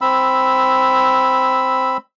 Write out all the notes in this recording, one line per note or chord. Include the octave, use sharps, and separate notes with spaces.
C4 B5 E6